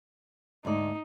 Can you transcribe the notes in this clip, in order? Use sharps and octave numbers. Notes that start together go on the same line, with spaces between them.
D2 G#2 D#4 D5